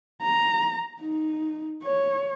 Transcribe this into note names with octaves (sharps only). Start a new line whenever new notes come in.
A#5
D#4
C#5